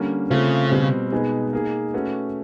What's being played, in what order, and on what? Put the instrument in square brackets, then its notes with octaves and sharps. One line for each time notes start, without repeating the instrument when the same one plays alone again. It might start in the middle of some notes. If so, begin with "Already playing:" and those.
Already playing: [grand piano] D3 G3 A#3 C#4
[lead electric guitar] C#3 [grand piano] A3 C4 F4
[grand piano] B2 G3 C4
B2 G#3 B3 D#4 G#4
A#3 D#4 G#4
A3 C#4 F#4 B4